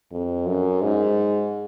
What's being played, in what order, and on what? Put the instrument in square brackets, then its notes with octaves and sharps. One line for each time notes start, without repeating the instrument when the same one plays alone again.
[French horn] F2
F#2
G#2